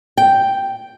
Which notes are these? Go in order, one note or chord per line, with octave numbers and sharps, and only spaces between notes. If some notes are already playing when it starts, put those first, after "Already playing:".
G5